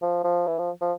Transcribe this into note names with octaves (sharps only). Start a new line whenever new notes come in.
F3
F3
E3
F3
F3